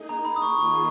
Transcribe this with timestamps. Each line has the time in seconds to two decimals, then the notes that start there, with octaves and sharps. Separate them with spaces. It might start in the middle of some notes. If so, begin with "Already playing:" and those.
Already playing: A#3 D#4 G#4
0.09 A#5
0.25 B5
0.36 D#6
0.42 C#6
0.58 D#3 A#3 F4 G#4 C#6